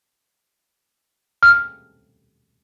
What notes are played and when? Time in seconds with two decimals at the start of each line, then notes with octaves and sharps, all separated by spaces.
1.43 F6